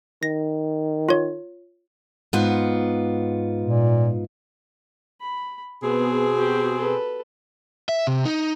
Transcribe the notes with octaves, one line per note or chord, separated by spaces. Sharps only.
D#3 A#6
F4 C#5
G#2 B3 F4
A#2
B5
B2 B3 C4 G#4
F#4 G4
A4 B4
E5
C3
D#4